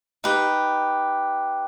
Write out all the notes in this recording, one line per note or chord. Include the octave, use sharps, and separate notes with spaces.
D#4 G4 B4